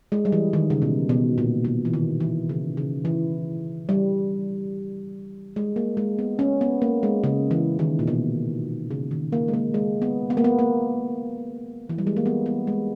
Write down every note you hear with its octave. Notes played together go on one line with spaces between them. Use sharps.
G#3
G3
E3
D#3
C#3
B2
B2
A#2
B2
E3
D#3
E3
C#3
C#3
E3
G3
G#3
A#3
G#3
B3
C#4
B3
A#3
G#3
C#3
E3
D#3
A#2
B2
C#3
D#3
A#3
G#3
A#3
G#3
B3
B3
A#3
B3
A#3
E3
G3
G#3
A#3
B3
B3
G#3